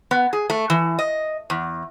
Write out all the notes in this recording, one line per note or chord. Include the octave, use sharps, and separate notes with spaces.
B3
G#4
A3
E3
D#5
E2